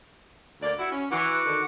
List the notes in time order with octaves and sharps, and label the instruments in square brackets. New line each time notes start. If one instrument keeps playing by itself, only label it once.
[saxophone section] D2 A#3 D5
E4 F#4
C#4
[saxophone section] E3 [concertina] F#4 F#5 D6
[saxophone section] D3 D#3